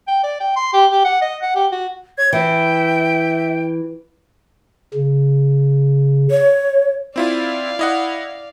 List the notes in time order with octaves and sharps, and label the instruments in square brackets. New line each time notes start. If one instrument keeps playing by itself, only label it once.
[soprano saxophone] G5
D5
G5
C6
G4
G4
F#5
D#5
F#5
G4
F#4
[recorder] C#5 [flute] G#6
[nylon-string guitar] E3 [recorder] E5 [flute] G5
[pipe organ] C#3
[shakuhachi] C#5
[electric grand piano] C4 E4 F4 [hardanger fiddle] D5 F5
[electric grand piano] E4 D#5 F#5